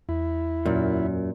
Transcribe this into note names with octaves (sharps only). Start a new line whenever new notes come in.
E2 E4
F#2 A#2